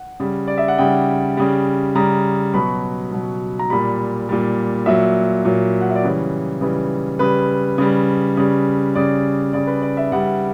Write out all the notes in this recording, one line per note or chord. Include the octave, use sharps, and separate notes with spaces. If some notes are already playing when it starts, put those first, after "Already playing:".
Already playing: F#5
C#3 G3
D5
E5
F#5
C#3 G3 G5
C#3 G3
C#3 G3 A#5
B2 F#3 B5
B2 F#3
A#5
A#2 G3 B5
A#2 G3
A#2 F#3 E5
A#2 F#3
F#5
E5
D5
C#3 E3 G3 C#5
C#3 E3 G3
C#3 G3 B4
C#3 G3
C#3 G3
C#3 G3 D5
C#3 G3 D5
B4
D5
E5
C#3 G3 F#5